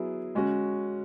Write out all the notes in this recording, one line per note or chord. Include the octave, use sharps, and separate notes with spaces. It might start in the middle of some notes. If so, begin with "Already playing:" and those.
Already playing: F#3 B3 E4 G#4
G#3 C#4 F#4